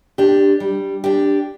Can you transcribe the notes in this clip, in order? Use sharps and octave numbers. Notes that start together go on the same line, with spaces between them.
D4 G4
G3
D4 G4